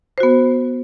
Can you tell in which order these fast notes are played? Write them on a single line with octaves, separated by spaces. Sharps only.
C5 F#4 B3